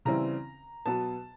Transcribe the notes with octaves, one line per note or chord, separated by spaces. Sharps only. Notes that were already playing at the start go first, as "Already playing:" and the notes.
C#3 E3 G3 C4 E4 A#5
B2 F#3 B3 A5